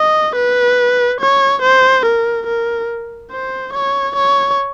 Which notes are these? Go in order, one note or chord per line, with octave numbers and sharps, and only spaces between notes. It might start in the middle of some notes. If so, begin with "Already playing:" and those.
Already playing: D#5
B4
C#5
C5
A#4
A#4
C5
C#5
C#5